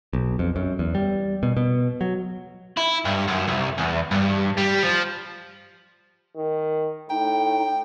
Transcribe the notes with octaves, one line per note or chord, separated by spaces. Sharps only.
B1
F2
F#2
E2
G3
B2
B2
F#3
E4
G2
F#2
C2
E2
G2
G3
F3
D#3
A2 D#4 G5